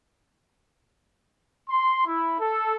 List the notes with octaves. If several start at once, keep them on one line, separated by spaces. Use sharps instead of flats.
C6
E4
A4